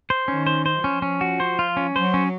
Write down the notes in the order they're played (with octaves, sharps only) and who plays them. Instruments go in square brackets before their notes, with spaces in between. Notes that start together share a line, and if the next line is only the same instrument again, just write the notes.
[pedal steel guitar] C5
[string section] D#3 [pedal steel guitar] C#4
[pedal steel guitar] C5
C5
[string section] F3 [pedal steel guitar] C#4
[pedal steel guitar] C#4
F#4
C5
F4
C#4
[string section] F#3 [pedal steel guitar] C5
[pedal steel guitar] C#4